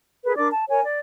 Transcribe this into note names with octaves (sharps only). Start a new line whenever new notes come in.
G#4 A#4 B4
D4 A#4 D5 D6
A5
A#4 C#5 G#5
D5